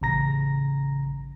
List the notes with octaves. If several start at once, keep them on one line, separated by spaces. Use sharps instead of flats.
A1 C#3 A#5 A#6